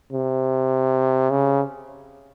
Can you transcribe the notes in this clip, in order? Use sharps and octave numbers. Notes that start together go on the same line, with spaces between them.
C3
C#3